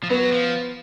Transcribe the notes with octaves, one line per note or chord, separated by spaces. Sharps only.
F3
F#3 B3
F3